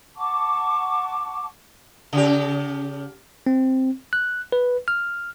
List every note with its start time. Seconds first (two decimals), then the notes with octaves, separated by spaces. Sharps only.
0.16 F#5 A5 C#6 D6
2.13 C#3 G4
3.47 C4
4.13 F#6
4.52 B4
4.88 F6